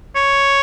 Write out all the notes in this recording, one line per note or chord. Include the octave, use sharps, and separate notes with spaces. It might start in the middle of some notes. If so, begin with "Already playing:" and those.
C#5